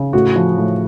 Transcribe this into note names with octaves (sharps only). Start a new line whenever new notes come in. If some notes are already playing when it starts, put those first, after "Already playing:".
Already playing: C#3
A2 F#4
F3
A2